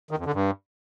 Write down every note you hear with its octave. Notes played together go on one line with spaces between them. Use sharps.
D#3
F2
D3
G2